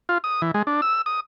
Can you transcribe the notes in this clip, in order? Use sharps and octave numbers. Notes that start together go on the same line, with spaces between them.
F4
D#6
E3
G#3
D4
E6
D#6